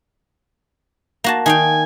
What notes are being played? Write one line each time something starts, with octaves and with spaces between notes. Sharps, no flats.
A#3 F#4 A5
D#3 F5 G5 G#5